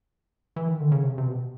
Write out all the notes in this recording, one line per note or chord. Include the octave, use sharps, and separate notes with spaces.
E3
D#3
D3
C#3
C3
C3
B2